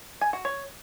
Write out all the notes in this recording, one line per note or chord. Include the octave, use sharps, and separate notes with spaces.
G#5
F#4
C#5